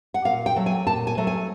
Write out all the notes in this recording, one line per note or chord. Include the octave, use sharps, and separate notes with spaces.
F#5
A#2 F5
G5
F#3 A3
G#5
A#2 A5
G#5
F#3 A3
G#5